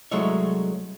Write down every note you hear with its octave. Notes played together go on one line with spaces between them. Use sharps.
C2 F#3 G#3 A3 C#5 E5